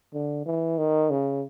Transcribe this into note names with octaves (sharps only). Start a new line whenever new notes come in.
D3
E3
D#3
C#3